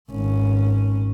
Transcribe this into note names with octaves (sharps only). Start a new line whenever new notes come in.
G#1 C#4